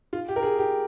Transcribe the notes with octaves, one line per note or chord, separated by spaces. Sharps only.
F4
G4
A#4
G#4
G4